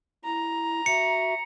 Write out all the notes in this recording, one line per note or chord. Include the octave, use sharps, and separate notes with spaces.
E4 A#5
F#4 E5 C#7